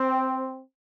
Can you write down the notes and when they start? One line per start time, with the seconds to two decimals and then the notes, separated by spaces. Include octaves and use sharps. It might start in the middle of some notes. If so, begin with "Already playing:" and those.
Already playing: C4